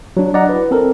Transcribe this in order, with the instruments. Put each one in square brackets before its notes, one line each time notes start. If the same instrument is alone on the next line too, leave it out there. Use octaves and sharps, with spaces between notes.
[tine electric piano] F#3 D4
D5 D#5 F#5 A#5
E4 B4
C4 A4 A#4